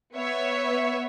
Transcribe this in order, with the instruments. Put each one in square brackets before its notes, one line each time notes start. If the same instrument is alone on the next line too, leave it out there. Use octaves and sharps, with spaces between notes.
[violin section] B3 C#5 E5